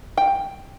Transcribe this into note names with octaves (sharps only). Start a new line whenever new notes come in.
G5